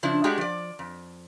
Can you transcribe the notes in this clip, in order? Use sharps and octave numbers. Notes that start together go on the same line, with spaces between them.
C#3 F3 D4 E4
G#3 A3 D4 F#4 G4
F3 D5
F2